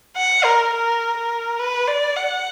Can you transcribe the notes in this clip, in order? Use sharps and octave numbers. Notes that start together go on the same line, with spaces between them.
F#5
A#4
A#4
A#4
B4
D5
F#5